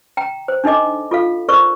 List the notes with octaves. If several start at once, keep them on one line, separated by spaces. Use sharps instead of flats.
G5 A#5
C5
D4 D#4 A4 D#5 D6
F4 A4 F5
A4 A#4 C5 D5 C#6